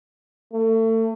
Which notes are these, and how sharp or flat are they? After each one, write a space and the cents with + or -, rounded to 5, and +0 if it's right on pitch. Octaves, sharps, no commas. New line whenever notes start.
A3 +30